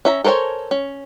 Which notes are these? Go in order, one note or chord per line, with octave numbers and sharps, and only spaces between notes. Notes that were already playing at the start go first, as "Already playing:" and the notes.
C#4 E5 A#5
A4 A#4 C5 C#5 G#5
C#4